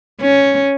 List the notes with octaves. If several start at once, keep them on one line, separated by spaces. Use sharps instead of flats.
C#4